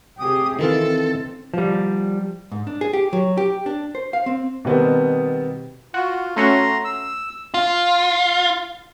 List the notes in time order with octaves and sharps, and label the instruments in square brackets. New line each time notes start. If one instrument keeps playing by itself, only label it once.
[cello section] C3 G4 G#4 [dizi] D#6
[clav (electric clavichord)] D#3 E3 F4 [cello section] C4 [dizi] A4
[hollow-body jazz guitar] F3 G3
G#2
D4
G#4
G4
F#3
G4
D4
C5
F5
C4
[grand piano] B2 D#3 G3 B3 C4
[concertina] F4 [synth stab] F#4
[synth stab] A3 C#4 F#4 [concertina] A#5 C6
[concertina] E6
[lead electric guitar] F4